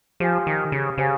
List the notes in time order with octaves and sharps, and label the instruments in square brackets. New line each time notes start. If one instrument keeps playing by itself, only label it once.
[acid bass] F3 [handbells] G4 C5 F5 G#5
[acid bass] D#3
C#3
[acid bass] C#3 [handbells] G4 C5 F5 G#5